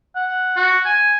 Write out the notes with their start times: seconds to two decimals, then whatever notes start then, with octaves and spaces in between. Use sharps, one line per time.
0.16 F#5
0.56 F#4
0.85 G#5